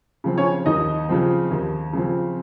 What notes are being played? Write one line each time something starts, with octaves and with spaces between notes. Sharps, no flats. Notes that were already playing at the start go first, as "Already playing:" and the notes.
C#3 F3 C4
C#4 C#5
D#2 D#4 D#5
C#3 F3 C4
D#2
C#3 F3 C4